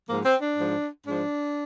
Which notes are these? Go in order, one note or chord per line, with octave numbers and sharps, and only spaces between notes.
G#2 F3 A#3
C4
D4
G#2 F3
G#2 F3 D4